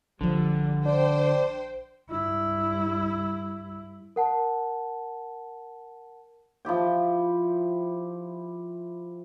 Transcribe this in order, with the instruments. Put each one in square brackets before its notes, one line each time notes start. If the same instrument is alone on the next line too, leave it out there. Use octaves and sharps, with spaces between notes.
[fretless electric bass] A#1 F3 [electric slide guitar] D3 [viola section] G3
[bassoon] D4 [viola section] C5 G5
[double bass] G2 E4
[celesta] A#4 F#5 A5
[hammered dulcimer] F3 E4 G4 G5